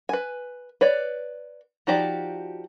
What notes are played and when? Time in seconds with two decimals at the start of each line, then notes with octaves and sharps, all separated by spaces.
0.09 B4 G#5
0.81 B4 C#5 D5
1.87 F3 D#4 F#4 G4 D5